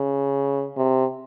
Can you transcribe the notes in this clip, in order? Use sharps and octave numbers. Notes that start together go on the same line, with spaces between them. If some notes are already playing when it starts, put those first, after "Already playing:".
Already playing: C#3
C3